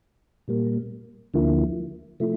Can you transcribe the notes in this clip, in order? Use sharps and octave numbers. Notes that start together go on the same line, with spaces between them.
A#2 G3 A#3
D2 D3 F3 A#3 E4
C3 F3 A3 E4